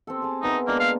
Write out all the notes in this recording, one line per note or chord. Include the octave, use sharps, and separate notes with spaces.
C4 G4 A4
G#4 A5
B3 D#4 A#4 E5
G#3 A#3 D4 F4
A#3 F5